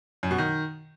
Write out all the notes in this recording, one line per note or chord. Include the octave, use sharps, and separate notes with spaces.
F#2
B2
D#3